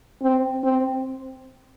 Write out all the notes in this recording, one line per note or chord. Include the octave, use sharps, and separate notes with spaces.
C4
C4